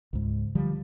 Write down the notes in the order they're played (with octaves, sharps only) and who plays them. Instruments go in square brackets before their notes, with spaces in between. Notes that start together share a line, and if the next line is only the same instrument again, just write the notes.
[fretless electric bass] C#2 G#2
D3 F3 G3